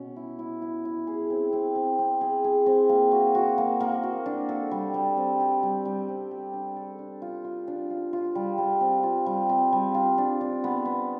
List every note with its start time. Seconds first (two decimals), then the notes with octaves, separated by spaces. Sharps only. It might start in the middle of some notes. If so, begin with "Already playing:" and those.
Already playing: B2 C#4
0.16 E4
0.39 E4
0.62 E4
0.85 E4
1.07 G#4
1.30 C4
1.53 C4
1.75 C4
1.99 C4
2.21 G#4
2.44 G#4
2.66 C4
2.89 A#3
3.12 F#4
3.35 F#4
3.58 A#3
3.80 A#3
4.03 F#4
4.26 D4
4.49 A4
4.71 G3
4.94 G3
5.17 C4
5.40 G4
5.63 G3
5.85 G3
6.09 C4
6.31 G4
6.53 D4
6.76 A4
6.99 D4
7.22 F4
7.44 F4
7.68 D4
7.90 F4
8.13 F4
8.35 G3
8.58 G3
8.81 C4
9.03 F4
9.26 G3
9.49 C4
9.72 G3
9.94 F4
10.18 D4
10.41 D4
10.64 B3
10.85 B3